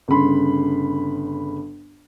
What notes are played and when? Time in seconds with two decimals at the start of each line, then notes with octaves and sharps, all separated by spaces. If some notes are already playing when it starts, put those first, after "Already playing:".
0.08 G1 C#3 B5 C6